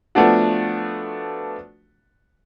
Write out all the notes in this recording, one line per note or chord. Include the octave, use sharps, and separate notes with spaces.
F3 A3 B3 D4 F#4